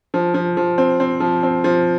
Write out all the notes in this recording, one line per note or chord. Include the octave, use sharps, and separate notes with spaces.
F3
F3
F3
C4
C4
F3
C4
F3